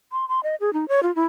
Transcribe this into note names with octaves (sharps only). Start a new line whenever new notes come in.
C6
C6
D#5
G#4
D#4
C#5
F4
E4